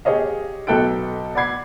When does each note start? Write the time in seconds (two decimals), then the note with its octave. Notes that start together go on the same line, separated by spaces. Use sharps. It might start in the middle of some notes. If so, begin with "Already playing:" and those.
0.05 G4 G#4 C#5 D#5 F5
0.67 B1 A4 G5 F#6 D7
1.35 D5 F#5 B5 G#6 C7